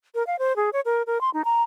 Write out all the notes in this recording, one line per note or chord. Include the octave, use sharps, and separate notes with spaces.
A#4
F5
C5
G#4
C#5
A#4
A#4
C6
D#4
A#5